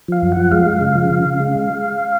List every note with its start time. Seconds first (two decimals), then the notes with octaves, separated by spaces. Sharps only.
0.08 F3 F5
0.22 F#2
0.32 F3 F#5
0.52 G#3 F5
0.66 G#3
0.81 C#3
0.95 F3
1.11 C#3
1.25 C#3
1.40 G#3